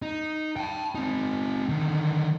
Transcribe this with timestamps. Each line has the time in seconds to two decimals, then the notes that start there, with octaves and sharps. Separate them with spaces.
0.02 D#4
0.57 G5 A5
0.95 C4 D#4
1.69 D3 D#3